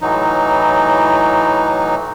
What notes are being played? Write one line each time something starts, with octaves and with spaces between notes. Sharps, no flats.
A2 E3 F#3 D#4